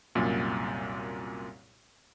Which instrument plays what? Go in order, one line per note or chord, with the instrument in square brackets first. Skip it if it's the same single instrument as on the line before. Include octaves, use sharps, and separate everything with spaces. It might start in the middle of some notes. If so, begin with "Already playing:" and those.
[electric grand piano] C2 F#2 A#2